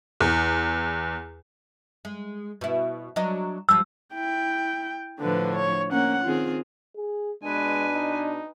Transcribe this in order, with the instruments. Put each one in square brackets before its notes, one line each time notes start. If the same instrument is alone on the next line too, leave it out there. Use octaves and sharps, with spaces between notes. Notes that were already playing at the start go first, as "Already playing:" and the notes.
[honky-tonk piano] E2
[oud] G#3
B2 E4
F#3 D4 D#5
[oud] F3 G3 [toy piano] E6
[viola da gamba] E4 [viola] G5
[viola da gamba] A2 F3 D4 [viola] D3 B4
[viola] C#5
[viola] A#3 F#5 [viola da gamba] C#4
[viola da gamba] D#3 C4 G#4 [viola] F4
[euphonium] G#4
[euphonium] B2 [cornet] G#3 [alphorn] D4 [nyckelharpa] B4 G#5
[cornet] D#4